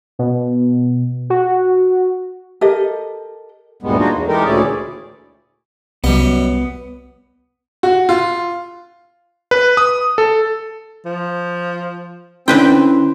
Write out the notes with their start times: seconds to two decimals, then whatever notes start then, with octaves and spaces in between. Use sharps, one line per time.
0.19 B2
1.30 F#4
2.61 G4 A4 A#4 D#5
3.83 D2 G2 A#2 G3 G#3 B3
3.98 A#3 D4 D#4 F4 F#4
4.11 E2
4.27 E3 G#3 D#4 G4 A4 A#4
4.44 D2 A#2 C#4 E4 G#4 D5
6.04 C2 F#2 G3 B3 D#5
7.83 F#4
8.09 F4
9.51 B4
9.77 D#6
10.18 A4
11.05 F3
12.48 D3 C4 C#4 E4 B4 G5 C6